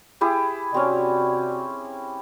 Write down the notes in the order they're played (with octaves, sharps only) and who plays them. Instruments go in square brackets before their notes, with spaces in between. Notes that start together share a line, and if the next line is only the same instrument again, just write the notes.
[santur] E4 G4 G#4
[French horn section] C3 F#4 D5 [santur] C4 C#4